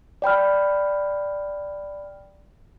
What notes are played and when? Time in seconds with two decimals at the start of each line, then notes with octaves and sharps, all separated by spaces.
0.22 D5 G5 B5 F6